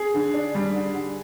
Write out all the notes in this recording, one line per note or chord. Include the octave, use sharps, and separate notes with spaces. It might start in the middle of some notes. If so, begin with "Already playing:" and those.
Already playing: G#4
D3
D4
G3
D3
D3